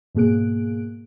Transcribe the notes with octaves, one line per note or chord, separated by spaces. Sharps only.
G#2 B2 A#3 G#4 F#6 D7